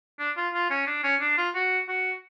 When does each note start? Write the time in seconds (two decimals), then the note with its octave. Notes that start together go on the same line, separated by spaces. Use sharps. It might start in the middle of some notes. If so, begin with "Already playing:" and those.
0.19 D4
0.37 F4
0.54 F4
0.70 C#4
0.87 D4
1.04 C#4
1.21 D4
1.38 F4
1.55 F#4
1.88 F#4